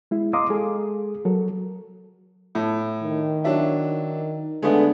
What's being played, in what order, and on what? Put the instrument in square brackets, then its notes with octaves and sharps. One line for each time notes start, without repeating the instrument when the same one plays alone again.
[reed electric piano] G#3 E4
D#5 F5 A#5 C6 D6 D#6
G#3 G#4 A4
F#3 A4 A#4
[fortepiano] A2
[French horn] D#3
[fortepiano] F#3 D4 E4
[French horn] D3 [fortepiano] G#3 A3 B3